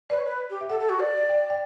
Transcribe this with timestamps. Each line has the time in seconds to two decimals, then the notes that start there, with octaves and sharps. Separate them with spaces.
0.10 B4 D5
0.18 C#5
0.25 B4
0.50 G4
0.61 E5
0.69 A4 F#5
0.80 A4
0.89 F#4
1.00 D5
1.29 G5
1.50 G5